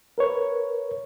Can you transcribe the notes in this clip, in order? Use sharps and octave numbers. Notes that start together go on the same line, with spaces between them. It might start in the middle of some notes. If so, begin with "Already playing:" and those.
A#4 B4 C#5